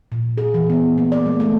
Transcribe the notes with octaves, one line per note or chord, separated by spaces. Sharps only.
A#2
G#4
E3
B3
A#3
D5
G#3
A3